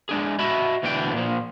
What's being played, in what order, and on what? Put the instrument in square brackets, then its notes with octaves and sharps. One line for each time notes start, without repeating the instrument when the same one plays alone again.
[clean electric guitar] G#3 D4 G#4
F#4 D#5 E5 A5 B5
D2 B2 E3 D4 E4 G5
A#2 F3